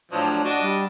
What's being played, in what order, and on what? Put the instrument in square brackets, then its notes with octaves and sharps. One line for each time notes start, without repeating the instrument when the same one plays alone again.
[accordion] A2 D4 [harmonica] F3 F#3
[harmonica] D4 D#5 [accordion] F#4
[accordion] G3